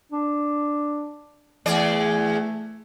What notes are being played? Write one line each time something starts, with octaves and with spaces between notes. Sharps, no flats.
D4
E2 A3 G#4 D5